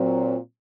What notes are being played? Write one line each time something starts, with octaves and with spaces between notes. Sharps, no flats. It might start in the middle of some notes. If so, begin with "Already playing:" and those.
Already playing: A#2 F#3 C4